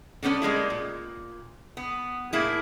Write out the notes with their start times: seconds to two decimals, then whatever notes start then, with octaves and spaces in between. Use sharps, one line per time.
0.23 D3 G3 B3 C#4 A4
0.42 G3 G#3 A#3 E4
0.70 A#2
1.77 B3
2.33 A2 A#3 E4 G#4